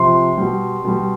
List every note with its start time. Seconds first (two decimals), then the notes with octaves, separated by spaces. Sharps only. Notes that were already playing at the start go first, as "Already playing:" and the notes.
Already playing: C3 F3 C6
0.38 B2 G3
0.84 B2 G3